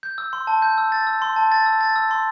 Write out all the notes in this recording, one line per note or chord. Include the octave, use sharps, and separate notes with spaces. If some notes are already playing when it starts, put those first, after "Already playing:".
G6
E6
C6
A5
G6
E6
A6
E6
C6
A5
A6
E6
A6
E6
C6